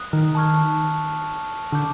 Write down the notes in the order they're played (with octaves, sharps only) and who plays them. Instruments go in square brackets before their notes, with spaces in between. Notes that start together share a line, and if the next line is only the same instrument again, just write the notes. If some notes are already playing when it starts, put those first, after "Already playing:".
Already playing: [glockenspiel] D#6 F#6
[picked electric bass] D#3
[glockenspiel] A5 C#6 F6 G#6
[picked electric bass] D3 [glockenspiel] A5 D6 G6